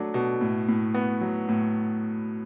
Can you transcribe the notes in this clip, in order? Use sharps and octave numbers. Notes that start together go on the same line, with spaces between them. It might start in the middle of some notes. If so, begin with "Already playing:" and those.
Already playing: F#3 A3 D4
B2
A2
A2
B3
F#3
A2